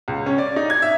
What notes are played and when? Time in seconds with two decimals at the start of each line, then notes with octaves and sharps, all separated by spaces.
0.08 C#2
0.26 C#4
0.38 D5
0.56 D#4
0.70 G#6
0.82 E5